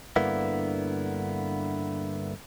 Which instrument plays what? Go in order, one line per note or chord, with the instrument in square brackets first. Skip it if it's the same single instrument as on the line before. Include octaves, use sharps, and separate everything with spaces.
[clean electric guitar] G2 D3 A#3 B3 E4